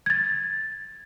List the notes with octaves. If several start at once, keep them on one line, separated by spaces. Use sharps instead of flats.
G#6 A6